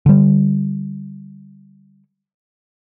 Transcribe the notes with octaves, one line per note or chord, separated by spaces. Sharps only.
D3 G3